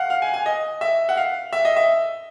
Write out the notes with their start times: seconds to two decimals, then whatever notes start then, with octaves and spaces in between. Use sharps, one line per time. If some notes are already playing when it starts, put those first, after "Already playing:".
Already playing: F5 F#5
0.10 F5
0.22 G#5
0.34 G#5
0.46 D#5
0.81 E5
1.09 F#5
1.17 F5
1.53 E5
1.65 D#5
1.76 E5